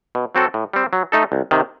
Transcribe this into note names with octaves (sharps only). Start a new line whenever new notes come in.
B2
F#3 C4 F#4 A4
A2
G3 C4
F#3
A3 D#4 A4
C2
C3 D#3